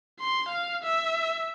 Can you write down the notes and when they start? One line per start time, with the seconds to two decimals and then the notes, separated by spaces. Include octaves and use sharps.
0.20 C6
0.49 F5
0.84 E5